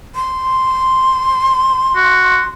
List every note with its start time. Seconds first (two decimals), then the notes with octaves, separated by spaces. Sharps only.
0.15 C6
1.96 F#4